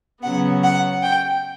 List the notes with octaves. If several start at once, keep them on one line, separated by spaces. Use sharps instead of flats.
C#3 F#3 B3 F#5
F#5
G5